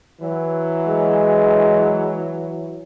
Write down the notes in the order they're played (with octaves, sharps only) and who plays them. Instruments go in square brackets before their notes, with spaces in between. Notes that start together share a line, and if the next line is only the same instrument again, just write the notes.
[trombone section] E3 F#3
[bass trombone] G#3